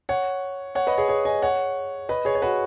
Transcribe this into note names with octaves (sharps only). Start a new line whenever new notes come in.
C#5 F#5
C#5 F#5
B4 D#5
G#4 C#5
G#4 C#5
D#5 G#5
C#5 F#5
B4 D#5
G#4 C#5
C#5
F#4 B4